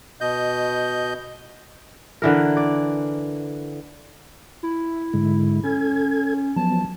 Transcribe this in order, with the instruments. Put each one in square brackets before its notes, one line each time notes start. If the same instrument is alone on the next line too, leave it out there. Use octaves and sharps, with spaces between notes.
[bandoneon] B2 D#5 G6
[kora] D3 E3 A#4
D5
[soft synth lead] E4
[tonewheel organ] G#2 D3 G#3
[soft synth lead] C#4 [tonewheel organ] A4 G#6
[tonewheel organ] F3 F#3 B3 [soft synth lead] A5